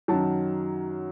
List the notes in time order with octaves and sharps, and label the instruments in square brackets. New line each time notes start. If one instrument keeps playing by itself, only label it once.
[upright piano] F#2 D#3 F#3 A5